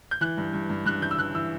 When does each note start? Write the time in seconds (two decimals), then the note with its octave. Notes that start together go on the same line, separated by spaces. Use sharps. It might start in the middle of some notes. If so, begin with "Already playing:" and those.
0.11 G6
0.21 E3 F#6
0.37 G2
0.53 G2
0.70 G2
0.86 G2 F#6
1.02 E3 G6
1.11 E6
1.18 E3 F#6
1.35 E3 E6